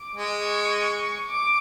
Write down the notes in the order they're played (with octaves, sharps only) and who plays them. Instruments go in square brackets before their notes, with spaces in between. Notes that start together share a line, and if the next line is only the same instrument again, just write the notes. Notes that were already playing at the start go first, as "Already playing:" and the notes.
Already playing: [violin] D6
[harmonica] G#3
[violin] C#6
D6